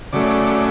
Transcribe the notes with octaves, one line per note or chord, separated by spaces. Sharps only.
C#3 F#3 A3 D5